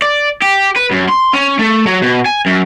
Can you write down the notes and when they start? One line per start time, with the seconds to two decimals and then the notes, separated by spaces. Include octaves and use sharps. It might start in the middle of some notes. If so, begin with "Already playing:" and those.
0.02 D5
0.42 G4
0.77 B4
0.92 F#2
1.09 C6
1.34 C#4
1.59 A3
1.87 F#3
2.02 B2
2.26 G#5
2.46 F#2